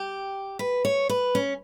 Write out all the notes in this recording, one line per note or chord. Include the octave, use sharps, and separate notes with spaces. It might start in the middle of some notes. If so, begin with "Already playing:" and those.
Already playing: G4
B4
C#5
B4
C#4